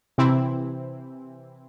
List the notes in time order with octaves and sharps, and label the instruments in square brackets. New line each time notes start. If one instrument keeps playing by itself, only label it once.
[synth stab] C3 E3 C4 E4